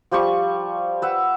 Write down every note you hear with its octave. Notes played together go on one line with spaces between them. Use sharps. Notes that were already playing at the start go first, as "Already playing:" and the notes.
F3 G3 G4 C#6
B4 E5 F#5